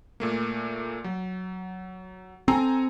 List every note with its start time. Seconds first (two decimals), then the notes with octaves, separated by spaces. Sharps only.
0.20 A#2 A3 A#3
1.04 F#3
2.48 C4 A4 G#5 A#5